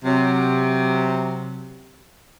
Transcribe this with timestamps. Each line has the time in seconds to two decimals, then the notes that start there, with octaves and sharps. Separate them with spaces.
0.05 C3 F#3